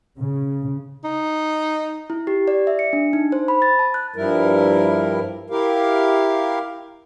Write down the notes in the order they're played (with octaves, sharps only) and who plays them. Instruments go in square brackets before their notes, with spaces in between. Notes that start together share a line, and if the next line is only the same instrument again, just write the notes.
[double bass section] C#3
[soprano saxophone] D#4
[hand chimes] E4
G4
D5
E5
C#7
D4
D#4
C5
B5
A6
A5
F#6
[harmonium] G2 F3 G3 E4 A#4
E4 G4 A#4 F5